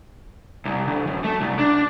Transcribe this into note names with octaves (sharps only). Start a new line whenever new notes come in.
C2
D2
F#2
A3
C2
D4